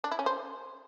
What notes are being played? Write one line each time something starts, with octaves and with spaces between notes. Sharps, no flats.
D4
E4
C#4
C5